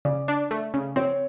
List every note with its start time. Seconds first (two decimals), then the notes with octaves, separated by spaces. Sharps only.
0.05 C#3 D5
0.28 D4
0.51 A3
0.74 C#3
0.96 C4 C#5